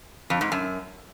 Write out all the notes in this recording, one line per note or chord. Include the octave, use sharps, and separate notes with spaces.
F2
G#2
F#2